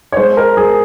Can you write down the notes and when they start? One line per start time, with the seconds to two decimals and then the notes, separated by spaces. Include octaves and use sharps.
0.12 C#5
0.17 G#3 C5
0.37 A#4
0.57 G#3 G#4